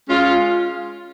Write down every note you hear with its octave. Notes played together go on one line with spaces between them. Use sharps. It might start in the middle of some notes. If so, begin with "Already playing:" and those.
G#3 C#4 F4